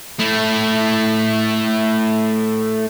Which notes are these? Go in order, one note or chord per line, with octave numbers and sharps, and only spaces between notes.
A3 E4